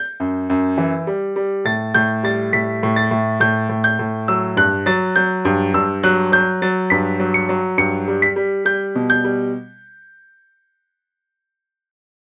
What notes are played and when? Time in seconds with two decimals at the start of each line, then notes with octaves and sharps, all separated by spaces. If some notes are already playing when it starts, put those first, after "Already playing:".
Already playing: G6
0.20 F#2
0.50 F#2
0.78 E3
1.07 G3
1.36 G3
1.65 A2 A6
1.94 A2 G6
2.23 G3 A6
2.53 A2 B6
2.83 A2
2.96 A6
3.11 A2
3.40 A2 G6
3.69 A2
3.84 G6
3.99 A2
4.28 F#3 E6
4.57 G2 F#6
4.86 F#3 A6
5.16 F#3 G6
5.45 G2
5.74 G2 E6
6.04 F#3 F#6
6.32 F#3 G6
6.62 F#3 A6
6.90 G2 B6
7.20 F#3
7.34 C#7
7.49 F#3
7.78 G2 C#7
8.08 G3
8.22 B6
8.36 G3
8.65 G3 G6
8.95 B2
9.10 G6
9.24 G3